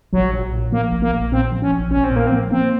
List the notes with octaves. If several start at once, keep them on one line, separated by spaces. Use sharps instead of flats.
A#1 F#3
A#1
A#2
F3 A#3
A#1
A#3
A#1
A#2 C4
F3
C#4
A#1
A#1 C#4
C4
A#2 A#3
C4
F3
A#3 C4